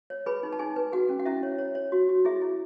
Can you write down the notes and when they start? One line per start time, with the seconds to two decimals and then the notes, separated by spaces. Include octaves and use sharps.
0.10 C#5
0.26 G#4 B4 B5
0.43 D#4
0.53 A5
0.59 D#4 G#4 G#5
0.76 B4
0.92 F#4 G#4 F#5
1.09 C#4
1.19 F#5
1.25 C#4 E4 E5
1.43 C#5
1.58 C#5
1.75 C#5
1.92 F#4
2.09 F#4
2.25 E4 G#4 E5
2.41 E4